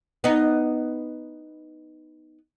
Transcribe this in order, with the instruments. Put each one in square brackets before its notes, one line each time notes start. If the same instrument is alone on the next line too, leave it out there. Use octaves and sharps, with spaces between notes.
[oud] B3 D#4